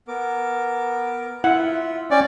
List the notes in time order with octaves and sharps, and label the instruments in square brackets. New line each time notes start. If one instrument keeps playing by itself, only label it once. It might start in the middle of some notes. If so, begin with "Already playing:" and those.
[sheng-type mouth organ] B3 A#4 D6
[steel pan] E4 F#5 [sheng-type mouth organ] F4 E5
[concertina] C#4 D5 [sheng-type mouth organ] C#5 G5 C#6